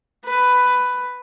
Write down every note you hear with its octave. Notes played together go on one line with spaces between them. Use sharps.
B4